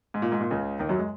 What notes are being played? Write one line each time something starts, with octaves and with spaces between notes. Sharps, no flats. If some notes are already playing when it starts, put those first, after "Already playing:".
G#2
A#2
G#2
A#2
C#2 C#3
D#2 D#3
F#2 F#3
G#3